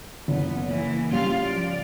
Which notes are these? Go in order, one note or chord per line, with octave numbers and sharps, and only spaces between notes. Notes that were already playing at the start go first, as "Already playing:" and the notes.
F#1 B3
E3 A#3
C#3 G3 F4 F5
F3 D5